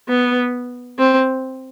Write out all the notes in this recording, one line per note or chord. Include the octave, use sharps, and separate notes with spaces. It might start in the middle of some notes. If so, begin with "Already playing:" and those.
B3
C4